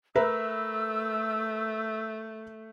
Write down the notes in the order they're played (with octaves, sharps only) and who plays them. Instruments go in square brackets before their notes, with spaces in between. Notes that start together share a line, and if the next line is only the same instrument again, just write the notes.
[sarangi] A3 [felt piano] A#4 B4 E5 [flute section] E6